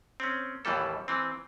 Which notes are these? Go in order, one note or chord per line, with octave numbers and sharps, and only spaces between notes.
C4 C#4
D#2 A2 E3 G3 A4
E3 C4